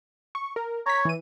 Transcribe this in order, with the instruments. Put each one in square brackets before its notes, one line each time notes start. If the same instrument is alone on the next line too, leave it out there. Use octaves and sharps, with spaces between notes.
[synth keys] C#6
A#4
[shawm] C#5 [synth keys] A#5 B6
[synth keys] E3 D#7